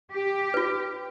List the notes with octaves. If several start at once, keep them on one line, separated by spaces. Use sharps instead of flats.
G4
F4 B4